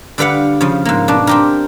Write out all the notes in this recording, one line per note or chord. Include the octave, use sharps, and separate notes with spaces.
D3 G3 B4 F5 F#5
C#3 F3
G#2 A#3
B2 D4
C4 G4 A#4